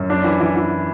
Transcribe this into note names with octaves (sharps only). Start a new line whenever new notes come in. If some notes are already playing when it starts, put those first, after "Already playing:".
Already playing: F#2
D4
E3
E3
E3